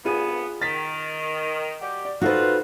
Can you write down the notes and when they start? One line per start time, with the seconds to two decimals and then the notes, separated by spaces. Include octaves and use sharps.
0.05 C2 G2 B3 F4 G#4 D#7
0.62 D#3 A6 B6
1.82 G3 F#4 G4
2.05 D5
2.21 D#4 F4 F#4 A4 B4 C5